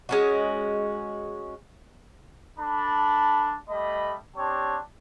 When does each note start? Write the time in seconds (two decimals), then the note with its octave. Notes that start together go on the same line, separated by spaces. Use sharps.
0.09 G#3 C#4 F#4
2.59 D4 A4 A5 B5
3.70 G3 A3 D#5 B5
4.37 C4 D4 G4 C#5 A5